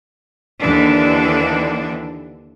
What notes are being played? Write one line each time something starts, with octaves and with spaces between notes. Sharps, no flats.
D#2 D3 E3 D4